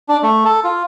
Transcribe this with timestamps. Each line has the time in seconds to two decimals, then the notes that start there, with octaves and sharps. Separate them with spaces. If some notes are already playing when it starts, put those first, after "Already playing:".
0.09 D4
0.23 A3
0.45 A4
0.64 F4